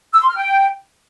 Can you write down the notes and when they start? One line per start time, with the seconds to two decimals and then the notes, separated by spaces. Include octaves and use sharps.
0.14 E6
0.22 C6
0.30 F6
0.38 G5